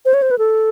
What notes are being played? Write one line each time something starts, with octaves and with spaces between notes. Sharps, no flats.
C5
C#5
C5
B4
A4